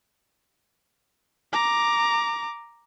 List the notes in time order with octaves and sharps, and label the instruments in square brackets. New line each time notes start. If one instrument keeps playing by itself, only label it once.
[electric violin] A#5 D6